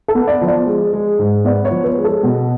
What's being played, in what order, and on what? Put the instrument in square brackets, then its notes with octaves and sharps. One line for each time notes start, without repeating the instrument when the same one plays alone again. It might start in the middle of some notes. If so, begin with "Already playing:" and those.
[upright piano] A4
[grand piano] B3
[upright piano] D5
[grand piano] F3
[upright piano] D5
[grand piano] G#3
G#3
G#2
[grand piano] B3 [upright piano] D5
[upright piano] C#5
[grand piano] F3
[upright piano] B4
[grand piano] G#3
[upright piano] A4
[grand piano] B2